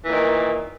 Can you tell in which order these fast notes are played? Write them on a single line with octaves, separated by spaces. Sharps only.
E3 A#2 D#3